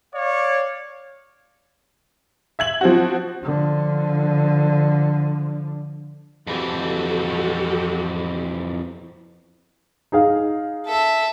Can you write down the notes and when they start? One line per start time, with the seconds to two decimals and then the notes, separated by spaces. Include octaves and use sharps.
0.13 C#5 D5 F5
2.59 E5 G#6 F#7
2.81 F3 C4 F#4
3.43 D3 F3
6.47 F2 E3 F#4 G4 A4
10.12 D#4 G#4 F5
10.86 A4 E5